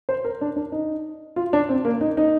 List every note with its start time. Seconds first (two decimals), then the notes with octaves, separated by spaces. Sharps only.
0.09 C5
0.25 A#4
0.41 D4
0.56 D4
0.72 D#4
1.36 F4
1.53 D4
1.69 C4
1.85 A#3
2.01 D#4
2.17 D#4